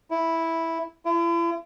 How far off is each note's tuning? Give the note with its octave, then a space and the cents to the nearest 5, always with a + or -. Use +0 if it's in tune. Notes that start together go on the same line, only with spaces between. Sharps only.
E4 -5
E4 +45